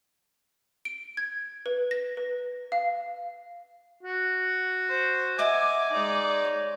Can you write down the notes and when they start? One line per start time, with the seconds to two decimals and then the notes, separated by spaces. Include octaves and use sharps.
0.85 D7
1.17 G#6
1.66 B4
1.91 A#6
2.17 B4
2.72 F5
4.03 F#4
4.89 C5
5.39 D#5 E5 F#5 G#5 D6
5.93 G#3 D#4 D5
6.45 C#5